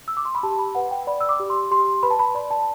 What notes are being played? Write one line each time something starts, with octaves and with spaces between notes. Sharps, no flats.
E6
D6
C6
B5
G4 A5
B5
B4 F#5
G5
D5 B5
E6
D6
G4
C6
G4 C6
B4 B5
A5
B5
D5 B5
A5